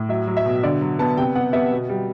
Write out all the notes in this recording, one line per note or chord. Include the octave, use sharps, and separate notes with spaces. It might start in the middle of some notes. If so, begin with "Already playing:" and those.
Already playing: A2
F#3 E5
F#3
E5
B2
D3 D5
F#3
B3 A5
C3 G5
B3 F#5
B3 E5
B2
G3